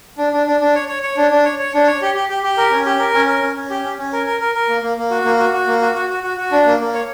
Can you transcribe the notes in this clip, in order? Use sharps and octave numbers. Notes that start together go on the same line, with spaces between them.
D4
D4
D4
D4
C#5
C#5
C#5
D4
D4
C#5
C#5
D4
C#5
G4
G4
G4
G4
A#4
C#4
G4
A#4
C#4
A#4
C#4
C#4
G4
C#4
C#4
A#4
A#4
A#4
A#4
A#3
A#3
A#3
F#4
A#3
F#4
F#4
A#3
F#4
F#4
F#4
F#4
F#4
D4
A#3
A#3
C#5